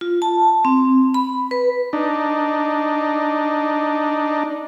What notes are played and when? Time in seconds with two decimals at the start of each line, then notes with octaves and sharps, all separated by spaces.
0.01 F4
0.22 A5
0.65 C4
1.14 B5
1.51 B4
1.93 D4 D#4